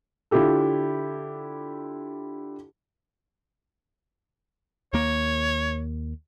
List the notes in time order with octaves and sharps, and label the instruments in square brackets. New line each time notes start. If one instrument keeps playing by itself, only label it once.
[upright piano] D3 E4 F4 G4 A4
[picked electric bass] D#2 A#3 [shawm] C#5